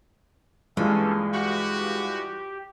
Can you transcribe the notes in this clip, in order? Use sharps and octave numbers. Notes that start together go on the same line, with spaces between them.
G2 E3 G#3 A#3 C#4 F4 A4
F#4 G4